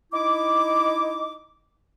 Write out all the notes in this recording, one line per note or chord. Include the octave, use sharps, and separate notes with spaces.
D#4 E4 D6